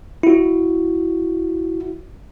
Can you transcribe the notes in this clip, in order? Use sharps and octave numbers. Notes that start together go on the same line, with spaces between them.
E4 F#4